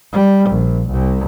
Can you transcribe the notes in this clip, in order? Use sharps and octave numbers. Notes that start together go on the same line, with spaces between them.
G3
A#1
C2